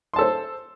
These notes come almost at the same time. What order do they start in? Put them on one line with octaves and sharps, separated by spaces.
C6 A5 A4 C5